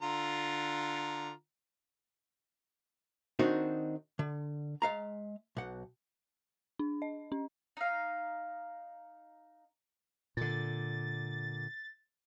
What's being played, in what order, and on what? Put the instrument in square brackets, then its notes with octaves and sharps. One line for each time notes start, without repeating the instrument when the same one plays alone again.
[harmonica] D3 F4 A#5
[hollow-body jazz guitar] D#3 C4 D4 D#4 F#4
D3
G#3 F5 A#5
B1 F#5
[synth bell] D4
D#5
C#4
[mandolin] D#4 F5
[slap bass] A#2 D3 [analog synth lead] A6